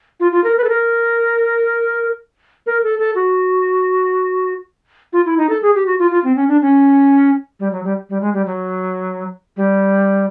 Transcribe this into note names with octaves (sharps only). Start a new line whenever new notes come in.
F4
F4
A#4
B4
A4
A#4
A#4
A4
A4
F#4
F4
E4
D#4
A4
G#4
G4
F#4
F4
F4
C4
C#4
D4
C#4
G3
F#3
G3
G3
G#3
G3
F#3
G3